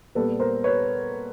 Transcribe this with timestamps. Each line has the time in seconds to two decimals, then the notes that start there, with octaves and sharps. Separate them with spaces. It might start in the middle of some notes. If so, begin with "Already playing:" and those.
0.15 A#2 G3 B3 A4 B4
0.40 A#4 C5
0.64 B4 C#5